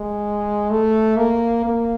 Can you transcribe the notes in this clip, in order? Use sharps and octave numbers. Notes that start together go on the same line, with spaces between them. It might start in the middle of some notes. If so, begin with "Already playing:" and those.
Already playing: G#3
A3
A#3
A#3